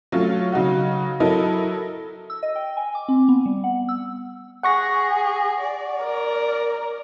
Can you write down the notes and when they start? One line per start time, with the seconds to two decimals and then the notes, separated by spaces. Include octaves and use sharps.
0.12 F#3 A3 C#4 F4
0.52 C#3 F#3 D#4 F#4
1.20 F#3 E4 A4 A#4 D#5
2.30 E6
2.43 D#5
2.56 G5
2.77 G#5
2.95 D6
3.09 C4
3.29 B3
3.46 G3
3.64 F#5
3.89 E6
4.63 G#4 F#5 C#6 A#6
5.60 D5
6.04 A#4